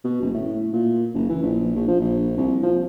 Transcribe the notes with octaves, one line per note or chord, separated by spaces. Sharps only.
B2
F#1
A2
A#2
F#1
E3
A#1
A#1
F3
A#1
C2
F3